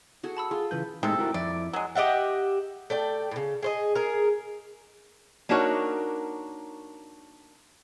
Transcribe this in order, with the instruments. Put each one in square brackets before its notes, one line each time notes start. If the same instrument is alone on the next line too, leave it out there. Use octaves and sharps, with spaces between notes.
[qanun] F#4 G#4 A4
[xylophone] A5 B5 E6
[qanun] F4 [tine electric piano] G#4
[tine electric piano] C#3 E3 G6 [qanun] B4
[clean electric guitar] A2 G#3 D#4 [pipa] C3 A4
[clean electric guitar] E4 F#4 A#4
[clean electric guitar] F2 E4 [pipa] D5
[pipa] F#3 G#3
[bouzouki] G4 D#5 E5 F#5
A3 D5 G5
A2 C#3
G#4 C5 D#5
G#4 A#4
[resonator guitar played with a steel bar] A#3 D4 D#4 F#4 A#4 C#5